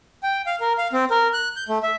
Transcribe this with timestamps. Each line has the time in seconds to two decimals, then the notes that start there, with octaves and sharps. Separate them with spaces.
0.23 G5
0.47 F5
0.61 A#4
0.78 F5
0.93 C4
1.11 A#4
1.33 F#6
1.56 G6
1.69 A3
1.83 E5